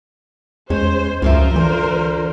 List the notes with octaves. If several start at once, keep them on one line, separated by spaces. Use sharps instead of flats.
E2 G#3 C#4 C5
C#2 F#2 F3 F4 A#4 C5 E5
D3 E3